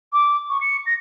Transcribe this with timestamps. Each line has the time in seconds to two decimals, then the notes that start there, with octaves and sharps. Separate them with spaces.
0.13 D6
0.50 C#6
0.61 C#7
0.86 A#6